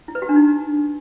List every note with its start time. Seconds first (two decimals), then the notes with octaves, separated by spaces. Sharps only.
0.08 E4
0.15 B4
0.22 F#4
0.29 D4
0.36 D#4